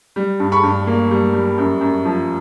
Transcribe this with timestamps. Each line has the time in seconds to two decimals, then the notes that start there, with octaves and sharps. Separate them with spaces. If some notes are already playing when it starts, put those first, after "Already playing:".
0.16 G3
0.40 G2
0.52 B5 C#6
0.63 G2
0.87 A#3
1.11 G3
1.34 G3
1.58 F#2
1.81 F#2
2.05 F3